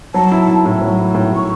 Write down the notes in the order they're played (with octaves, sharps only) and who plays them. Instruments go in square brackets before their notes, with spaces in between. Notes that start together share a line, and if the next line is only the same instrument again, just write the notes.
[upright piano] F#3 [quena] A5
[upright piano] E4
E4
A2
F#3
E4
A2
[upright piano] A2 [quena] C#6